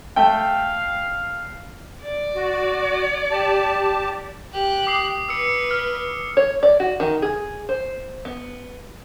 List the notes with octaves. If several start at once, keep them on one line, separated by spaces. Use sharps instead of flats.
A3 E5 F5 G5
D5
F#4
G4 A5
G4 F#6
D6 D#6 C7
B4 E6 C#7
F6
C#5
D5
F#4
D#3
G#4
C5
B3